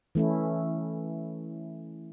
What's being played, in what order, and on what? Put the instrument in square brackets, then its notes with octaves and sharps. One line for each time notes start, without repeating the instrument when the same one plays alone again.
[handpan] E3 A3 C#4 E4